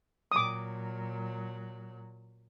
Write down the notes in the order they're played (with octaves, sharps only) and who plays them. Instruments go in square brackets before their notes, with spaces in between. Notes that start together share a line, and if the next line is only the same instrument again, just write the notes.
[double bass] A#2 F#3 [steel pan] D6 D#6